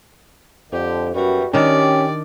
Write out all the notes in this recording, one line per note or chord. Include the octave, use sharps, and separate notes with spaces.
F2 D3 G4
F#2 E3 G3 B3 F#4
D#3 C#4 D4 G4 D5